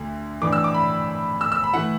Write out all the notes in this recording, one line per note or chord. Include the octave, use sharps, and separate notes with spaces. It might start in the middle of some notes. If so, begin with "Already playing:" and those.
Already playing: D2 D3 A3
A2 E3 D4 D6
E6
D6
B5
E6
E6
B5
E3 A3 E4 F#5